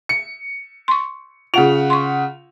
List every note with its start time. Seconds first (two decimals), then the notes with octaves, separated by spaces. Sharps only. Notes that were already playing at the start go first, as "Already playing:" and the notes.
0.09 C#7
0.88 C6 C#6
1.54 C#3 F4 F#5 F7
1.90 C6 C#6